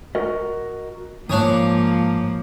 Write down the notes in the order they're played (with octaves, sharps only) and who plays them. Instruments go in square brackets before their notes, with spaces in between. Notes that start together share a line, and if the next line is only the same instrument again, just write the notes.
[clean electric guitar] F#4 A#4 D#5
[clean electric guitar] E2 G#2 [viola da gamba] F3 A#3 [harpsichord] D4 C#5 D#6